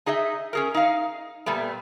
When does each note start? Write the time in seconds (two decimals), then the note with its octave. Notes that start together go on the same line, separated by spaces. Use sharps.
0.06 D#4 G#4 D#5 E5
0.53 C#4 G#4 A#4
0.74 D#4 F5
1.46 A#2 G3 A3 B3